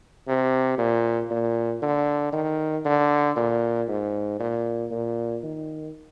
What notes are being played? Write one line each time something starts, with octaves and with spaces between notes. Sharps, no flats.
C3
A#2
A#2
D3
D#3
D3
A#2
G#2
A#2
A#2
D#3